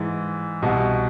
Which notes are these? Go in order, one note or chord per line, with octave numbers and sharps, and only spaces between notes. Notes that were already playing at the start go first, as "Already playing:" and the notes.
Already playing: G#2 E3
C2 B2